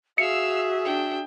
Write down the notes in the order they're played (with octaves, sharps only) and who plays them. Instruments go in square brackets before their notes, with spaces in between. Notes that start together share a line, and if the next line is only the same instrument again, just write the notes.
[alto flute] F#4 [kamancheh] G#4 E5 [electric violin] F5 E6 [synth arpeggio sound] C#7
[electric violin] D4 G5